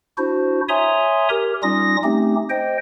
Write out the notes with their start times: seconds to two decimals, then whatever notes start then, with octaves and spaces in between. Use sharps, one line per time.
0.18 D4 E4 F#4 C5
0.69 C#5 E5 G#5 A#5 C6 D#6
1.30 G4 A#4
1.63 G3 C#4 D#4 F4 D#6 A#6
2.04 A3 C4 C#4 D#4 G4
2.50 C5 D#5 G5